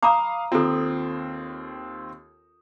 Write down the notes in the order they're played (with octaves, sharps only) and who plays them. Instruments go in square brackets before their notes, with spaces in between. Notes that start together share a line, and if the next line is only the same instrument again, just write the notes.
[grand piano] F5 D#6 [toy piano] A#5 B5 D6
[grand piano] D#2 C4 [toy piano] F4 A4